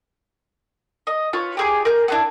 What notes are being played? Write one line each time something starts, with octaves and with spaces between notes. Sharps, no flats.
D#5
F4 B4 C#5
G4 G#4 D6
A#4 G6
B3 D4 E4